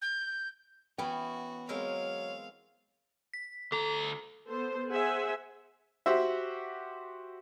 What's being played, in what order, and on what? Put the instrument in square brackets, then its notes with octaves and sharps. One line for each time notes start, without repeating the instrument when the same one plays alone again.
[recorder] G6
[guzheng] E3 B3 C#4 [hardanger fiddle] F#4 [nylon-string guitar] G5
[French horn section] F#3 C#5 [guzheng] G#3 C4 A#4 [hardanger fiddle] F5
[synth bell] B6
[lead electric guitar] D2 A#5 [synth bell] A4
[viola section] B3 A4 C5
G#4 C5 E5 F#5 G#5
[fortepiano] F#4 G4 C5 E5